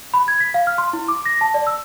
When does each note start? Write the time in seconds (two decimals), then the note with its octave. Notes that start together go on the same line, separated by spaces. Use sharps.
0.14 B5
0.28 G#6
0.40 B6
0.54 F5
0.67 F6
0.78 C6
0.93 E4
1.08 D6
1.26 A#6
1.41 A5
1.54 D5
1.67 E6